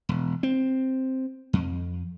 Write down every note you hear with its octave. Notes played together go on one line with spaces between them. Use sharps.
E1
C4
F2